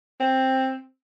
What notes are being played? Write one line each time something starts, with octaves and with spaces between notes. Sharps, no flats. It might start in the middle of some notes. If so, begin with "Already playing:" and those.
C4